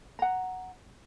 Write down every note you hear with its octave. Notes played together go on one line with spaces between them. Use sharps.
F#5 A#5